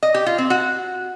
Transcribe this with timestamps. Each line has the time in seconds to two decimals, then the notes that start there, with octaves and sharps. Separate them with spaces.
0.03 D#5
0.14 G4
0.26 F4
0.38 C4
0.50 F#4